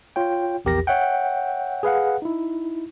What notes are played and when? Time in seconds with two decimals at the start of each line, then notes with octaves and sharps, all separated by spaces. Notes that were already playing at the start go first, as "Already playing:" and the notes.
0.16 F4 C#5 G5
0.65 A#1 E2 G4 A#4 A#6
0.87 C#5 E5 F#5 G5
1.83 G#4 B4 F5 F#5
2.22 D#4 E4